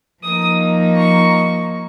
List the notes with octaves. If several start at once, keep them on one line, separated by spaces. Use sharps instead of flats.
F3 A#3 D#4 D#6
C#6